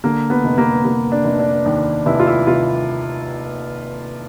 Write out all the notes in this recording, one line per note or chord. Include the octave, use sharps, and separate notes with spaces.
D3 A#3
B3
F1
A#3
F1 A#3
D4
F1
D4
D#2
F1 E4
F4
E4
F1 F4